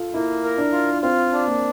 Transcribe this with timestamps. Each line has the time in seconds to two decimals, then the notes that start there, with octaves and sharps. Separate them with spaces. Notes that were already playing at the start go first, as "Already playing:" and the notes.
Already playing: F4 A4
0.14 A#3 E4
0.44 A#4
0.58 D4
0.72 F4
1.02 C4 F4
1.32 D4
1.47 A#3